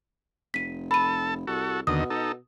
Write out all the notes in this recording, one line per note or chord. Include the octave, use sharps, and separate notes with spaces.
F1 B6 D#7
A4 A5 B5 D#7
C2 F#4 A4
D#2 B2 D3 D#5 D#6
D#4 A4